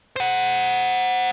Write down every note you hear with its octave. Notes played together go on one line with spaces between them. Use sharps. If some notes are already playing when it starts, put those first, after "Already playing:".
C5 F#5